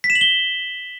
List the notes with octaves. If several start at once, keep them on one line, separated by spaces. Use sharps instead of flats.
B6
E7
F#7
G7